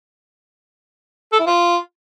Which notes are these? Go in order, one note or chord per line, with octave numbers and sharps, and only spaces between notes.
A4
E4
F4